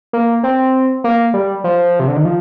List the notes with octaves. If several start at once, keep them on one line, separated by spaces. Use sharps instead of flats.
A#3
C4
A#3
G3
F3
C3
D3
D#3
F3